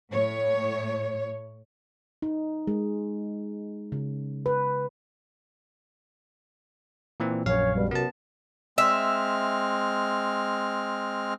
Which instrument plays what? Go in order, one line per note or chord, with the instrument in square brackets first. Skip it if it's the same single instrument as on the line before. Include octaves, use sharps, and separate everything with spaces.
[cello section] A2 C#5
[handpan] D#4
G#3
C#3
B4
[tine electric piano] A#2 E3 C4
[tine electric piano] A#1 F#2 F5 [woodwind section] C#4 C#5
[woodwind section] G2 B2 G3
[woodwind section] F#2 C3 [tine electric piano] B3 A5
[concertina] G#3 C4 F6 [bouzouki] E5